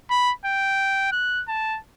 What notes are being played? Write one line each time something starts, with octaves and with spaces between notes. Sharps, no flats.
B5
G5
F#6
A5